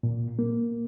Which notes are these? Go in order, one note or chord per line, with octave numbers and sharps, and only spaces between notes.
A#2
A#3